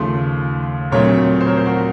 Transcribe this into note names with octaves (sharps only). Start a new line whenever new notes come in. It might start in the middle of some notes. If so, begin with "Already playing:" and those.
Already playing: D#2 C#3 F3 A3 C6
A#1 A#2 F#3 A3 C4 A#4 C#5
C5
A#4 C#5
C5
F#4 A#4